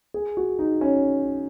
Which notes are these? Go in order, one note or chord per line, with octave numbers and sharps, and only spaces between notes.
G#4
F#4
D#4
C#4